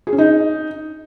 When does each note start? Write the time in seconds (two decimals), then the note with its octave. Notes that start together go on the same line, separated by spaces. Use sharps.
0.07 G#4
0.13 C#4
0.18 D#4